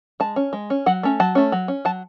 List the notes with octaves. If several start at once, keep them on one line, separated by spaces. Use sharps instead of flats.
G#3 A5
C#4
G#3
C#4
F#3 F#5
A3 C#4
F#3 A5
A3 C#4
F#3
C#4
F#3 A5